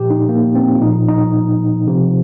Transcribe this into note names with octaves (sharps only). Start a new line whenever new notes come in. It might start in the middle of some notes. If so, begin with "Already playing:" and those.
Already playing: A#2 F3 G4
D#4
A#3
C4
F4
A#2 F3 D#4
D#4
C3 F3